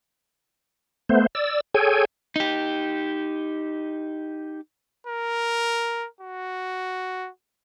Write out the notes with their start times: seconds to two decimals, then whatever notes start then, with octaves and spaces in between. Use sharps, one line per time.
1.09 A3 B3 C5
1.35 D5 E6
1.74 G#4 A4 C#5 G5 G#5
2.36 D#4 G4
5.07 A#4
6.21 F#4